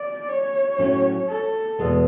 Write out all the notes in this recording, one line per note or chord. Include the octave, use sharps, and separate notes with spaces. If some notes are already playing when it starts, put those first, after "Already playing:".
Already playing: D5
C#5
A2 F#3 A3 C#4
A4
E2 B2 G#3 B3